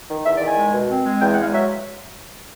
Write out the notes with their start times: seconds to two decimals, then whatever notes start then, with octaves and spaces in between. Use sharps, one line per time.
0.09 D#3
0.24 E2 E5
0.35 D5
0.40 D#3
0.45 G#5
0.56 G#3
0.73 B2
0.88 C4
1.04 G#3
1.19 E2 G5
1.31 F#5
1.36 G#3 F5
1.52 F#3 E5